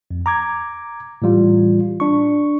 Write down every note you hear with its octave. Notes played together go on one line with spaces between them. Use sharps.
F2
A#5 D6 G#6
A2 E3 G3 F4
D4 C#6